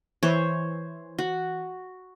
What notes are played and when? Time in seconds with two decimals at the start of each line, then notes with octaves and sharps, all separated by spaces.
0.23 E3 C5 C#5
1.19 F#4